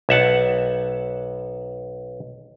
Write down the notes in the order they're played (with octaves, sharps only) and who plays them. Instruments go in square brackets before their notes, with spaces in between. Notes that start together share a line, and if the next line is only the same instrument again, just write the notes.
[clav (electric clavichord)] B1 E5 F#5 A5